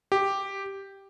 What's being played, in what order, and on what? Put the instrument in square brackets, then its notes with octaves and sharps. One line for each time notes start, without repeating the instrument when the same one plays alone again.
[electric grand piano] G4